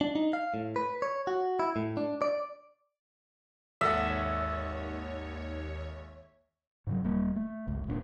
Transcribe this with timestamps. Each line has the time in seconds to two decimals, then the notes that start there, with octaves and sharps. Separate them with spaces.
0.01 D4
0.15 D#4
0.33 F5
0.54 A2
0.76 B4
1.02 C#5
1.27 F#4
1.59 E4
1.76 A2
1.97 D4
2.22 D5
3.81 G#1 D#2 A4 C#5 E5 F#5
6.87 G#2 C#3 F#3
7.04 D#1 G3 A#3
7.36 A3
7.67 G1 C#2
7.87 D#1 A#2 C4 D4